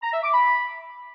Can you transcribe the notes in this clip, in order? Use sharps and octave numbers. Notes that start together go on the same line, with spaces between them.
A#5
E5
D6
B5